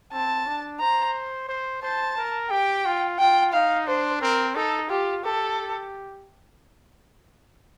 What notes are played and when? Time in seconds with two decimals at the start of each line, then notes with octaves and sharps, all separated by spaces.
0.13 C4 A5
0.47 D4
0.81 C5 A#5
1.49 C5
1.83 C5 A5
2.17 A#4
2.51 G4 G5
2.86 F4
3.19 F4 G5
3.53 D#4 F5
3.87 D4 C5
4.21 C4 A#4
4.56 D#4 A4
4.90 F4 G4
5.24 G4 A4